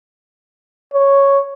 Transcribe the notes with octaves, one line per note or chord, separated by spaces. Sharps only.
C#5